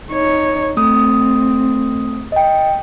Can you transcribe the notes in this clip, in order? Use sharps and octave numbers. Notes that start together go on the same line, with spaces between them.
D#4 C#5
A3 C4 D#6
D#5 G5